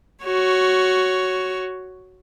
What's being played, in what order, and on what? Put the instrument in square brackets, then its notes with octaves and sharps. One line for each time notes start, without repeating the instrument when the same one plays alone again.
[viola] F#4 C#5